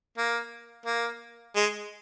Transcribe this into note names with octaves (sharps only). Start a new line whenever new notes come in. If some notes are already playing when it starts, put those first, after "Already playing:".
A#3
A#3
G#3